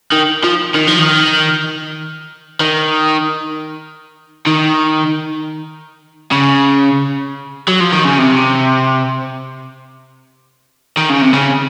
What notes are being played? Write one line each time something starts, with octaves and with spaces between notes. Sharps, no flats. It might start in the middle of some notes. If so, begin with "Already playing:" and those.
D#3
F3
D#3
F3
D#3
D#3
D#3
C#3
F#3
F3
D#3
C#3
C3
D#3
C#3
C3
C#3